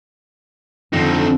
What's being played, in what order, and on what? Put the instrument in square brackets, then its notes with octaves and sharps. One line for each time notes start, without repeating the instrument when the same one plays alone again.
[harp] F2 D3 [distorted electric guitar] C4 D#4